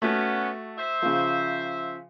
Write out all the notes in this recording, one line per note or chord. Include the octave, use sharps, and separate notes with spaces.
A3 B3 C#4 F#4
C5 E5
C#3 F3